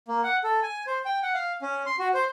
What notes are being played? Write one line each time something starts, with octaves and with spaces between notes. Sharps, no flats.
A#3
F#5
A4
G#5
C5
G5
F#5
F5
C#4
C6
F#4
C5